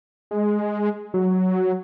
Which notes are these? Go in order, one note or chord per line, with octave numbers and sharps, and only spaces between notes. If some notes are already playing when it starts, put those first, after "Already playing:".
G#3
F#3